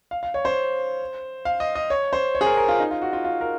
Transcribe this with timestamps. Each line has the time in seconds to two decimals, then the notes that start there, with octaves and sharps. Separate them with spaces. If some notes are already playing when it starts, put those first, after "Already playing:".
0.11 F5
0.23 F5
0.34 C#5
0.45 C5
1.45 F5
1.60 D#5
1.75 D#5
1.90 C#5
2.13 C5
2.35 C#5
2.41 G#4
2.46 A#4
2.57 A#4
2.68 F4
2.80 D#4
2.91 F4
3.02 F#4
3.13 F4
3.24 F4
3.41 A#4